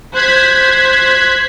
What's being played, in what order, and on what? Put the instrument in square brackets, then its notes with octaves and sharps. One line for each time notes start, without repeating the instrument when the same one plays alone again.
[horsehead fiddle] C5 [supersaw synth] F#6 G#6 B6